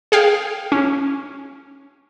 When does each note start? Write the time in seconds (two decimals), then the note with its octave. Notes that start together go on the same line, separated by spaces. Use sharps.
0.12 G#4 F5 G5
0.72 C#4